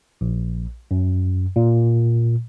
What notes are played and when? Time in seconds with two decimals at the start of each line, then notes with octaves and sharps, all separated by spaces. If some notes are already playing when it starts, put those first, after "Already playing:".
0.21 A#1
0.91 F#2
1.56 A#2